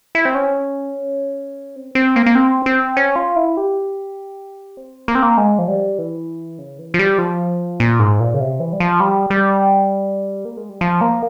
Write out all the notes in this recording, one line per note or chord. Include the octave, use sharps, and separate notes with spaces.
E4
C4
C#4
C4
C4
A#3
A#3
C4
C4
C#4
F4
E4
G4
C4
A#3
C4
A#3
G#3
F3
G3
E3
C#3
E3
F3
G3
F3
A#2
G#2
A#2
C#3
C3
E3
G3
F3
G3
G3
A#3
G#3
G3
F3
A#3